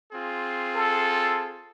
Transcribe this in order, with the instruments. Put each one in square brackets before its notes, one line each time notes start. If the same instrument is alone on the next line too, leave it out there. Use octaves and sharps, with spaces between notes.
[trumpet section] C4 F4 G#4
[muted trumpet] A4